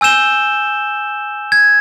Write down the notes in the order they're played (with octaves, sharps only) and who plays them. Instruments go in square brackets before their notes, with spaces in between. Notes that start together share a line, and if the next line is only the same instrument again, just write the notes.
[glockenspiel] G#5 E6 G6 E7 G7
G#6